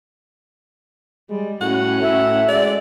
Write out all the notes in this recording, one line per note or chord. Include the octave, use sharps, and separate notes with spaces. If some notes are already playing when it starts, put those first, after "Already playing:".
G3 G#3
A2 C#4 F#4 F#5
A2 E5
G#3 D5